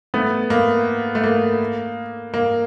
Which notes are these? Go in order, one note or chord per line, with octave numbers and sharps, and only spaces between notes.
A3 B3
A#3
A3
A#3
A#3